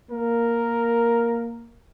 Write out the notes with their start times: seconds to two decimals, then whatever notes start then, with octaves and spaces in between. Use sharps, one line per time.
0.11 A#3 A#4